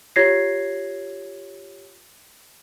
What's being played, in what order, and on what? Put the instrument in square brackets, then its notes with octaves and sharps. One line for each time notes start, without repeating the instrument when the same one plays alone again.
[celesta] F4 G4 C#5 G#6 A#6 C7